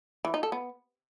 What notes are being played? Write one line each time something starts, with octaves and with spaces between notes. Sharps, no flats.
E3
D#4
A4
B3